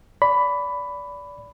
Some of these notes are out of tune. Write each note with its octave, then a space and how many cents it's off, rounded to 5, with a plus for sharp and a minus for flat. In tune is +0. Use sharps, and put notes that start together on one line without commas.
D5 -25 B5 +10